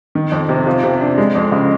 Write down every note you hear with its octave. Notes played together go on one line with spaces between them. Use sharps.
D#3
F2
C3
F3
C3
D4
G#3
F2
C#3